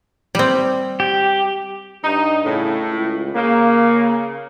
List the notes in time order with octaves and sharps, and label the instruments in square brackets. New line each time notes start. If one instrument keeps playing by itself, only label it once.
[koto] G3 C4
[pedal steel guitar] G4
[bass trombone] G2 [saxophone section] D#4
[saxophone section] A2 [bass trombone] C#3
[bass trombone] C#2
[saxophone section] C#3 [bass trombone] A#3